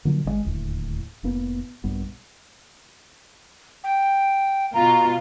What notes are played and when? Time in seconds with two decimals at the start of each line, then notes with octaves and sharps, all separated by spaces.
0.05 A#2 D3 F3 F#3
0.24 G#1 D3 G#3
0.45 D1 D#2 A2
1.23 F1 A2 A#3 B3
1.84 A#1 G2 B3
3.84 G5
4.74 B2 F4 A#5